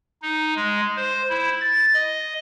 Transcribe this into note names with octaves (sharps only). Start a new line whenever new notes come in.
D#4
G#3
C5
E4
A6
D#5